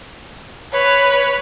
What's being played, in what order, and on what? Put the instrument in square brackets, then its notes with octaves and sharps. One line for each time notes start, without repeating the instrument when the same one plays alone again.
[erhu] B4 [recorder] C#5